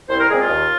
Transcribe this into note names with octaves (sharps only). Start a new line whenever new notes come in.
C2 C5
A#4
A#2 G#3 C4 G#4
F4
D#2